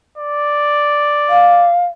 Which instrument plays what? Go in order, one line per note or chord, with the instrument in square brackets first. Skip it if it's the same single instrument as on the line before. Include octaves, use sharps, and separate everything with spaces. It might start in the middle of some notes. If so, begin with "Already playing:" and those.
[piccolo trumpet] D5
[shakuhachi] F5